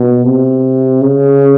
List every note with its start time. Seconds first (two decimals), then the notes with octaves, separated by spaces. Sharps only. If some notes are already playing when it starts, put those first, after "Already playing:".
Already playing: B2
0.24 C3
1.02 C#3